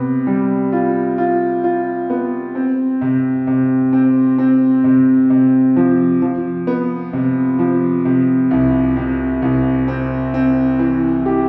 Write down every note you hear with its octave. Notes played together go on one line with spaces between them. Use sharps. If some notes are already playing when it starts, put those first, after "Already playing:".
Already playing: C3 B3
G3
F4
F4
F4
B3
C4
C3
C3
C4
C4
C3
C3
F3
F3
B3
C3
F3
C3
C2
C3
C2
C4
C4
E3
G4